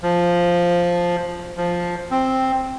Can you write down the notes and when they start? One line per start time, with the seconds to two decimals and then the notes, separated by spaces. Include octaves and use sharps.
0.02 F3
1.57 F3
2.11 C4